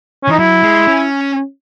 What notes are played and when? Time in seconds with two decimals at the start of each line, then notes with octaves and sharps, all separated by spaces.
0.24 C#4
0.29 E3 D#4
0.39 F#3 E4
0.63 G#3
0.88 C#4